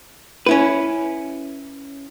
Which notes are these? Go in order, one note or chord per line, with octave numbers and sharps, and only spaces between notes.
C#4 E4 B4